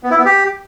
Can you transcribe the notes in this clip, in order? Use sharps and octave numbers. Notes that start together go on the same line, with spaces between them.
B3
E4
B3
G4